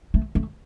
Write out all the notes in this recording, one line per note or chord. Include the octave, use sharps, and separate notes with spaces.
A3
A3